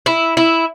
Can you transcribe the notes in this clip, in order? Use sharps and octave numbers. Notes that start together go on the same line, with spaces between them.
E4
E4